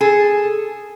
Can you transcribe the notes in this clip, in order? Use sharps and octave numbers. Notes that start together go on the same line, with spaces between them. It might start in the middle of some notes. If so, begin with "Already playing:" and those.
G#4 A4